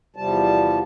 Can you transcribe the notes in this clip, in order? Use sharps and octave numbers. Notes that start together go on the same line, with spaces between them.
E2 C3 F3 G3 A5